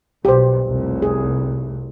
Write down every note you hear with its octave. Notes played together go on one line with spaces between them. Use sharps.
B1 B2 G4 C5
F1 C2
G#4